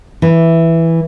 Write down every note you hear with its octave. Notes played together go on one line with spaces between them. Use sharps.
E3